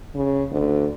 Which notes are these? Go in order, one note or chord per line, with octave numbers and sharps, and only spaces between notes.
C#3
D2